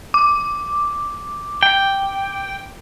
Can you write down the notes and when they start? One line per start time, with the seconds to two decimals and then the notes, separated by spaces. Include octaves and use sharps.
0.14 D6
1.63 G5